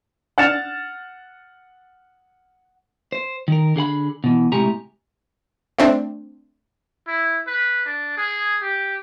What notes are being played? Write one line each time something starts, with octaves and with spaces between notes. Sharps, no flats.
F#5 F6 A6 C#7 E7 F7
C5
D#3 A#4
D3 G#4 F#5 B5
B2 E3
A2 C3 G#3 G4 G#5 A#5
A3 C4 D4
E4
B4
D4
G#4
G4